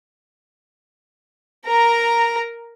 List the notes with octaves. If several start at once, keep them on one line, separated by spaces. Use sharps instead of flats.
A#4 A#5